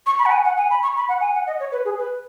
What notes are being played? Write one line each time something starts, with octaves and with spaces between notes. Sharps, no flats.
C#6
B5
F#5
G#5
F#5
G#5
B5
C#6
B5
F#5
G#5
F#5
D#5
C#5
B4
G#4
B4